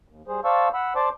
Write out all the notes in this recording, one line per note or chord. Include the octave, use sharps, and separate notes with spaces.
D#2
G3 G#4 C5
C5 D5 F5 A5 C#6 E6
F#5 B5 E6
C5 D5 A5 C6 D6